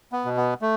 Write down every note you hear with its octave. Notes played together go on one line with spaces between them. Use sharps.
B3
B2
B3
A3